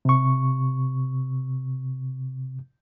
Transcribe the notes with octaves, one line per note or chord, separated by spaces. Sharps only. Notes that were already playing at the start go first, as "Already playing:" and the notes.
C3 C#6